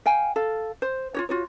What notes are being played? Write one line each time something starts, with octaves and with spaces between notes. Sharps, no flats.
F5 G5 G#5
A4 F5
C5
F4 F#4 C#5
F4 F#4 C#5